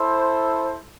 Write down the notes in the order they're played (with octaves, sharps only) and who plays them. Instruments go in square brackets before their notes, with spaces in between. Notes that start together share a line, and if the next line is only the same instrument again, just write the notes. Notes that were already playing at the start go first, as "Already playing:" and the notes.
Already playing: [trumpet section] E4 A4 C5